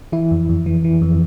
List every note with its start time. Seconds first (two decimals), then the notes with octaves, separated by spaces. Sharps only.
0.12 E3 E4
0.31 F2
0.49 F2
0.66 E3
0.84 E3
1.01 F2